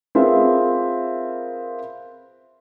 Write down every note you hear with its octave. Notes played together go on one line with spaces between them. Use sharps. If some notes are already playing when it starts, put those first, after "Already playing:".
C4 F4 G#4 A#4 B4 E5